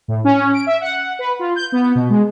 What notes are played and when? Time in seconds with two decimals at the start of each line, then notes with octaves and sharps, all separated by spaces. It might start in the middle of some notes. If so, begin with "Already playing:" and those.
0.08 A2
0.24 C#4
0.54 D7
0.66 E5
0.81 F#5
1.19 B4
1.39 F4
1.56 G6
1.72 B3
1.95 B2
2.10 G#3